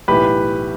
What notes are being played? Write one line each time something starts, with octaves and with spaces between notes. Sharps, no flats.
B1 A2 E3 G4 B4